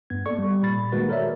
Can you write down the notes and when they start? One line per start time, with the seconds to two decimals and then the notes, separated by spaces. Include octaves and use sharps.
0.10 G2 B3 G#6
0.26 A#3 A4 D5 C#6
0.39 G3
0.63 A#2 B5 A6
0.92 D#3 G#3 A#3 F#4 A#4 B4
1.09 A4 A#4 C#5 D5 E5